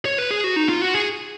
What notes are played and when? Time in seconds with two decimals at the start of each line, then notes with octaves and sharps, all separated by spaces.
0.05 C#5
0.18 B4
0.31 G#4
0.44 F#4
0.56 D#4
0.69 F4
0.82 F#4
0.94 G#4